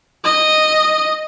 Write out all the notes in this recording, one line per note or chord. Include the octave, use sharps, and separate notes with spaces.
D#5